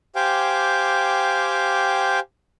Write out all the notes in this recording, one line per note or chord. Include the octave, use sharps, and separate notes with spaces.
G4 C5 F5 G5 G#5 D6